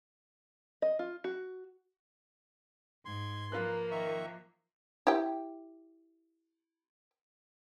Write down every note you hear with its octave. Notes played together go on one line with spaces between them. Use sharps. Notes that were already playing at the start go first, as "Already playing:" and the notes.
D#5
F4
F#4
G#2 C6 G#6
F3 A#3 F4 A#4 B4 F#6
D#3 E5 C#6
E4 G4 G5